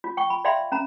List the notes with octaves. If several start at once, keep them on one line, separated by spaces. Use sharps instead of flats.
F4
G5 C#6
B5
D5 E5 F5 G5 B5 C6
C#4 A#5 B5